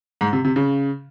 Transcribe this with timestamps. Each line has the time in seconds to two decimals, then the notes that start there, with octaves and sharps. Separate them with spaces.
0.21 G#2
0.33 C3
0.44 C3
0.56 C#3